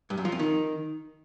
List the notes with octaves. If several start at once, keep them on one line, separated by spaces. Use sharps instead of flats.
G2
F#2
F3
F2
D#3